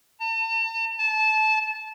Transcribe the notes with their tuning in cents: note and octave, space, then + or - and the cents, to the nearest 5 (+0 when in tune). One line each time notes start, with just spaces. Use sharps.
A5 +40
A5 -20